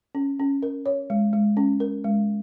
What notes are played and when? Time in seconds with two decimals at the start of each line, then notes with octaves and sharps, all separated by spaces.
0.15 C#4
0.39 C#4
0.63 A#4
0.86 C#5
1.10 G#3
1.33 G#3
1.57 C#4
1.80 A#4
2.04 G#3